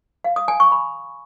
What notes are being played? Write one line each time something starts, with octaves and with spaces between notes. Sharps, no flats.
F5
D#6
G#5
C#6
B5